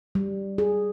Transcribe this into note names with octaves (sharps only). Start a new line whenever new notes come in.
G3
G#4